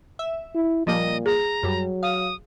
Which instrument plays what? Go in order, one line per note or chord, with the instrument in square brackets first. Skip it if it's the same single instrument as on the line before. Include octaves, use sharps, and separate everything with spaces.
[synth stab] E5
[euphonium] E4
[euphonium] A#2 [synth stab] F3 G3 A#3 [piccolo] D#5
[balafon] G#4 [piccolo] A#5
[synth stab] F#2 G3 [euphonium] F#3
[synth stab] F5 [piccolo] D#6